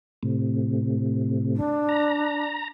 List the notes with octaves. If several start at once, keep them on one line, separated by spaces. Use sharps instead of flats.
A2 C3
D4
A#5